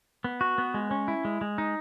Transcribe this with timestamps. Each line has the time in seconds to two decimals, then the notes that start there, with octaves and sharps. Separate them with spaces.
0.24 B3
0.41 F#4
0.58 B3
0.74 G#3
0.91 C#4
1.08 E4
1.25 G#3
1.41 G#3
1.58 D#4